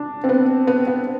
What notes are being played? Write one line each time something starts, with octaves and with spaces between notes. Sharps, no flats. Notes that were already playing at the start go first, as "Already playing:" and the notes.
Already playing: D4
C4
B3
B3
B3